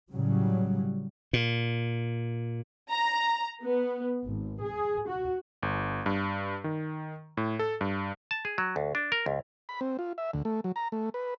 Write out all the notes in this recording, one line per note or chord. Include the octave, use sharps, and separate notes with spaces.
A2 C#3 F#3 G3
A#2
A#5
B3
G#1
G#4
F#4
G1
G2
D#3
A2
A4
G2
A5
G#4
F#3
D2
D4
A#4
C#2
B5
C4
F4
E5
D2
A3
F#3
A#5
A3
B4